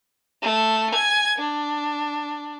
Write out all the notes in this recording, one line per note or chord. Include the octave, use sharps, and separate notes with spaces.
A3 E7
G#5 G#6
D4